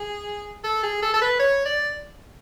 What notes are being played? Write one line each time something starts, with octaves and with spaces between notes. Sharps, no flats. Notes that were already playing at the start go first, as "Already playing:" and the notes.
Already playing: G#4
A4
G#4
A4
A4
B4
C#5
D5